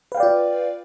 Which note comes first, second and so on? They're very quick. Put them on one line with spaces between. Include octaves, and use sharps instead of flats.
B4 F5 G5 D5 F4